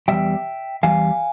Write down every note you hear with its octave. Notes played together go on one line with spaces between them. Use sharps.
E2 E3 G3 E5 G5
E2 E3 G3 F5 G#5